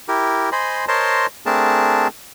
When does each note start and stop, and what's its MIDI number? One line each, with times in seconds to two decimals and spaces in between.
0.08 0.50 64
0.08 0.50 67
0.08 0.50 70
0.52 0.85 72
0.52 0.85 75
0.52 0.85 80
0.52 0.85 83
0.52 0.85 84
0.88 1.26 70
0.88 1.26 72
0.88 1.26 73
0.88 1.26 75
0.88 1.26 81
0.88 1.26 84
1.46 2.08 57
1.46 2.08 60
1.46 2.08 62
1.46 2.08 68
1.46 2.08 70
1.46 2.08 81